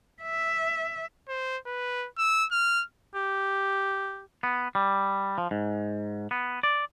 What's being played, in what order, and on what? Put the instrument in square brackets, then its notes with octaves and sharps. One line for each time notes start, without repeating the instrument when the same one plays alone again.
[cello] E5
[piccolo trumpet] C5
B4
E6
F6
[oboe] G4
[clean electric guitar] B3
G3
F3
G#2
B3
D5